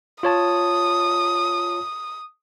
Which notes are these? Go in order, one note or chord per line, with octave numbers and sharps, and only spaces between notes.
F4 C#5 A5 D#6